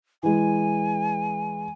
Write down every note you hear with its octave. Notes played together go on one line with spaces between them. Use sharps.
E3 G#3 G#5